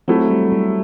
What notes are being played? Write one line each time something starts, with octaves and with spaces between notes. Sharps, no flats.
F#3 A3 C4 E4
G3
G3